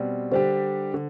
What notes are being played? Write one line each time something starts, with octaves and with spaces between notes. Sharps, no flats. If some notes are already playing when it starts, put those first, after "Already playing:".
Already playing: B2 G3 C4 D5
D3 G3 D4 G4 C5
D3